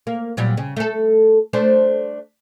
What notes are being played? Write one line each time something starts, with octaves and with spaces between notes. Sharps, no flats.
A#3
A#2 F#3 G3
C#3
A3 A4
A3 D4 C5